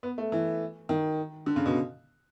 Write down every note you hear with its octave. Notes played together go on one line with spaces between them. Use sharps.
B3
A3
E3
D#3
D3
C#3
B2